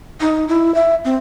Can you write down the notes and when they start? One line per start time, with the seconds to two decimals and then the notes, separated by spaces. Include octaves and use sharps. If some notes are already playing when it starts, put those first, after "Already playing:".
0.21 D#4
0.48 E4
0.75 E5
1.05 C4